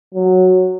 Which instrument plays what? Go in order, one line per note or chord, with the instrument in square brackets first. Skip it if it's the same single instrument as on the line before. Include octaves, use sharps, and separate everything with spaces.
[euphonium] F#3